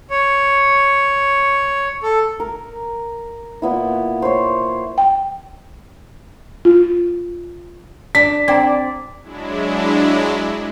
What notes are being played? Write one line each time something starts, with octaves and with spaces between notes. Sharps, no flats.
C#5
A4
A#4
A#2 B3 E4
C5 C#5
G5
F4
D4 B6
C4 D4 D5 G5 A#5
F#3 G#3 D4 E4